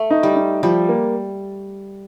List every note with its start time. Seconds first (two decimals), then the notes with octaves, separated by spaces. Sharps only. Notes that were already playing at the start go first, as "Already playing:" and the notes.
Already playing: A3
0.10 D#4
0.23 G3
0.36 D#4
0.63 F3 G3
0.89 A#3